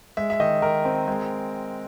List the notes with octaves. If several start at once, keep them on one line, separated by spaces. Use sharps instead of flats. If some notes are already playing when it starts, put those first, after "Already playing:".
G#3 E5
E5
D#3 D#5
D#3 A#4
C4
G#3